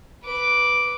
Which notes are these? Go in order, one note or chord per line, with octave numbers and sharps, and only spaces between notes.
B4 D6